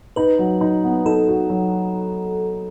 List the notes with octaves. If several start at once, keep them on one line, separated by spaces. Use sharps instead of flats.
D#4 B4
F#3
D#4
B3
D#4 A4
F#4
F#3